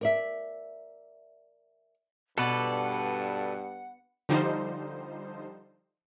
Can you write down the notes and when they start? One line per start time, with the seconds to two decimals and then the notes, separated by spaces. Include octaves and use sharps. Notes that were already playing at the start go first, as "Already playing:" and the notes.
0.01 A#4 D5 E5
2.38 G2 B2 A4 B4 D5 F#5
4.29 D3 F3 G3 D#4 C5